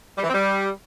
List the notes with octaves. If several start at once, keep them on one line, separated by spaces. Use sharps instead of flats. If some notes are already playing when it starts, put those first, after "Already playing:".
G3
E3
C4
G3